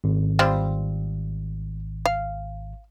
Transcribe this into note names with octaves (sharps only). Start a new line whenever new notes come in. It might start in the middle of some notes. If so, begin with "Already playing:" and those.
G#1
G3 C4 F4
F5